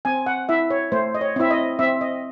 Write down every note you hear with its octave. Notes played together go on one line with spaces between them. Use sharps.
C4 G#5
F#5
E4 E5
C#5
A3 C5
D#5
C#5
C4 E4 E5
D#5
C4 E5
D#5